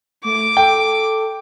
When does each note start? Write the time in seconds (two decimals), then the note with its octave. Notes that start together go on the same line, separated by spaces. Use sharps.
0.24 A3 D6
0.57 A4 G5